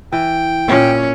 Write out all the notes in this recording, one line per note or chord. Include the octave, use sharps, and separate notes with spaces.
E3 G5
A#2 C#4 E4